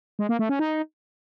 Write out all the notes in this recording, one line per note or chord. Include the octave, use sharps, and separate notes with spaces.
G#3
A#3
A3
C#4
D#4